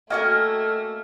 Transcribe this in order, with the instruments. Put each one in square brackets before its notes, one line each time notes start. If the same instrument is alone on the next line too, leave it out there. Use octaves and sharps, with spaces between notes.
[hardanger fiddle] A3 [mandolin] A#3 C#4 A#4 [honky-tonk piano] F#4 D#5 G5